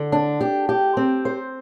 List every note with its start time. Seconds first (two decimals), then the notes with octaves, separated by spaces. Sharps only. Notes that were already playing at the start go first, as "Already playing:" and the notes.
Already playing: D3
0.12 D4
0.41 G4
0.69 G4
0.97 C4
1.25 C5